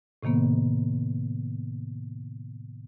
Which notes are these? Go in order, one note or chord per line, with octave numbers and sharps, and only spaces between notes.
A2 C3 D#3 A#3 B3